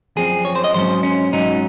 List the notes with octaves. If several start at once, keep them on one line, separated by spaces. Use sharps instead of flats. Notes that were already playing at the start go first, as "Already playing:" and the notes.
F#2 F3 C4 G#4
C#5
C5
D#5
G#2 F#3 C#4 C5
C#4
G#2 F#3 C#4 D#4